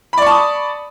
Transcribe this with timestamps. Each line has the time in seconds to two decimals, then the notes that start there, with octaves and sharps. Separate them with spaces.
0.13 B5
0.18 D5
0.22 C#6
0.27 A5
0.31 D#6